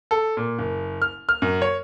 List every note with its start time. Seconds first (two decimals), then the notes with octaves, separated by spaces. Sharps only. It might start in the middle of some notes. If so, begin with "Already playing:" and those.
0.11 A4
0.37 A#2
0.58 F#1
1.02 F6
1.29 F6
1.42 F#2
1.62 C#5